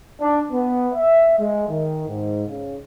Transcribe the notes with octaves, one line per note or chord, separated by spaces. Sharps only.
D4
B3
E5
G#3
D#3
G#2
C#3